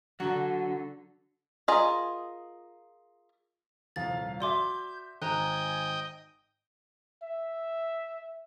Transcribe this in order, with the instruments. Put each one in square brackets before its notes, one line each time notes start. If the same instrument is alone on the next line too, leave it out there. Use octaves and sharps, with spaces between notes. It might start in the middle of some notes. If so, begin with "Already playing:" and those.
[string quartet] D3 [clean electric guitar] F#3 [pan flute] D4 [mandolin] F#4
[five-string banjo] F4 G#4 A#4 D#5
[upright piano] D#1 C2 F2 [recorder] F5 [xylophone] A6
[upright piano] F#4 E5 [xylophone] D5 C6 D6 [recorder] G6
[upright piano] G#1 [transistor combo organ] D#5 G5 [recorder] G#5 [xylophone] A#5 F#6
[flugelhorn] E5